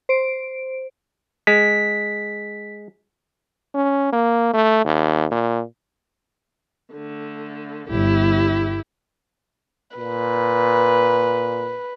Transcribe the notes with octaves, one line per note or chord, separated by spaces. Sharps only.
C5 D7
G#3 B6
C#4
A#3
A3
D#2
A#2
D3 A3
G1 E4 G4
A#2 B4